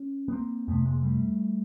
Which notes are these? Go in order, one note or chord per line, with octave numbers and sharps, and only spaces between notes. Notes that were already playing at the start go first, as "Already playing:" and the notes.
Already playing: C#4
B3
A#3 C4
F2 C3 A3 B3
G#3 A#3
G3 A3